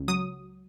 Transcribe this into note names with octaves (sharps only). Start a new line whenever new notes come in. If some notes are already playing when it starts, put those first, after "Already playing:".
Already playing: C#2
F#3 D#6